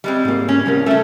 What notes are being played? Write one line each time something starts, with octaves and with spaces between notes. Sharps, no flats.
G3 G#3 C4
G#2 A#3
C#4
C2 G3 A#4
A3 C#4 A4 E5